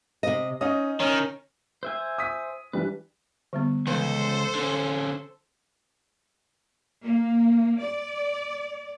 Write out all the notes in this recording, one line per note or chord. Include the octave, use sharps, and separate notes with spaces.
C3 D#5
C#4 D#4 D#5 D#6
D#3 C#4
C5 E5 G#5
D#6 B6
E3 G3 D4 B4
D3 G3 B3
C#2 E3 A4 B4 C5
D3 C#4
A#3
D5